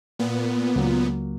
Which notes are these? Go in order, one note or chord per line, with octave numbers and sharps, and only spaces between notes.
A#2 B3
C#2 F#3 A#3